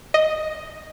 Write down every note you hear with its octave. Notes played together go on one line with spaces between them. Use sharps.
D#5